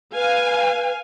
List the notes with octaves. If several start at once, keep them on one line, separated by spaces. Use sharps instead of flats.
B4 F5 G#5